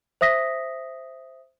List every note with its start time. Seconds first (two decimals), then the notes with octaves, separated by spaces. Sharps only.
0.21 C5 E5 D#6 A#6 B6